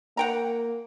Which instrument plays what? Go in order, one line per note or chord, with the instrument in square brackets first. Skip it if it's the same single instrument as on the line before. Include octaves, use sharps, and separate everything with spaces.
[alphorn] A#3 [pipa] F#5 G5 A#5